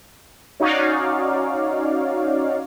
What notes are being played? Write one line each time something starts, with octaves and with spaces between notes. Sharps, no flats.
C#4 D#4 F#4 C#5 D5 F5